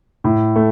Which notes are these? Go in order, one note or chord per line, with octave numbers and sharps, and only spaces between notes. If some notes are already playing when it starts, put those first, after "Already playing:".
A2
A3